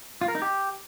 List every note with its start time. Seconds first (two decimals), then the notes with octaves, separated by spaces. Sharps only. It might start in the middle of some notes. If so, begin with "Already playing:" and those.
0.21 F4
0.28 A#4
0.35 D#4
0.42 G4